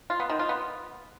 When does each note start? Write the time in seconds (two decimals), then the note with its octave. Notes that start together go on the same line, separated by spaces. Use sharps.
0.10 F4
0.20 B3
0.29 D#3
0.39 F4
0.49 B3